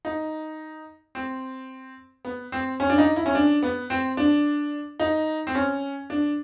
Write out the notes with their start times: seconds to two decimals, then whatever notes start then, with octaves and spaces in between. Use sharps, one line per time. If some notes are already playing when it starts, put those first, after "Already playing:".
0.05 D#4
1.15 C4
2.25 B3
2.52 C4
2.80 C#4
2.90 D4
2.98 D#4
3.16 E4
3.26 C#4
3.35 D4
3.63 B3
3.90 C4
4.17 D4
5.00 D#4
5.47 C4
5.55 C#4
6.10 D4